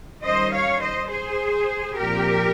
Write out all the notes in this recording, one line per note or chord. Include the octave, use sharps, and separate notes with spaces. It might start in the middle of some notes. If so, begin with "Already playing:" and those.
D#3 G3 C#4 C5 D#5
C#5 F5
C5 D#5
G#4 C5
A#2 F3 C4 G4 A#4